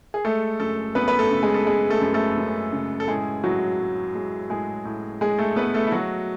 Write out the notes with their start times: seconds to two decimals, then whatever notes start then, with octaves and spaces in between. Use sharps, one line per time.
0.14 G#4
0.25 G#3 A3 A4
0.60 F#2 A3 A4
0.95 F#2 B3 B4
1.08 B4
1.19 A3 A4
1.31 C#3
1.43 G#3 G#4
1.54 A4
1.66 G#3 G#4
1.90 A3 A4
2.02 F#2
2.14 A3 A4
2.37 F#2
2.73 C#3
3.00 A4
3.08 A2 G#3 G#4
3.44 A2 F#3 F#4
3.80 G#3
4.15 G#3
4.50 A2 G#3 G#4
4.85 A2
5.21 G#3 G#4
5.39 A3 A4
5.56 G#3 B3 B4
5.74 A3 A4
5.87 E4
5.92 F#3 A3 F#4